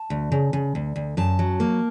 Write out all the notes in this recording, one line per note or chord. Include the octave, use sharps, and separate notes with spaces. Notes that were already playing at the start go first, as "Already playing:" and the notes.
Already playing: A5
D2
C#3
C#3
D2
D2
F#2 A5
F#3
A#3